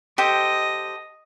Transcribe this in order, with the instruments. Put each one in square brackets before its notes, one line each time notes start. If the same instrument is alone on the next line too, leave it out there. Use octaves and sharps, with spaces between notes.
[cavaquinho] G4 A4 C5 [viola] D#5